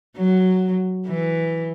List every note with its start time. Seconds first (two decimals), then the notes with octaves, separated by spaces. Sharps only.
0.17 F#3
1.07 E3